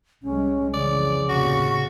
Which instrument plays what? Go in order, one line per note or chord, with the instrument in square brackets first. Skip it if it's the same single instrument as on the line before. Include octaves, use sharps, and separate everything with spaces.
[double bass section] C2 G3 G#3 [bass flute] C#4
[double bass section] F2 E3 [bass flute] C#3 [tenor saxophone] D5
[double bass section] A1 D#2 C3 [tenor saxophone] F#4 [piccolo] C#6